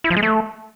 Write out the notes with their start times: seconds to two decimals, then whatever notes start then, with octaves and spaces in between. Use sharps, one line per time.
0.04 E4
0.10 F3
0.17 G#3
0.23 A3